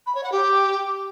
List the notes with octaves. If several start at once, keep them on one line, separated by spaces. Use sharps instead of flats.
B5
C#5
F#5
G4